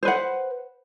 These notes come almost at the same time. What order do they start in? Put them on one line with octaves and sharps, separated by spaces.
C5 B4 F#5